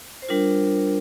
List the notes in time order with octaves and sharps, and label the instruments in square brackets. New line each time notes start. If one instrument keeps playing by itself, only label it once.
[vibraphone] C5
G3 D4 F4 A#4